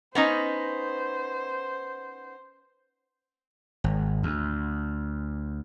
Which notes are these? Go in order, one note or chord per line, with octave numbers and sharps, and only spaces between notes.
B3 C#4 D#4 C5
G#1
D2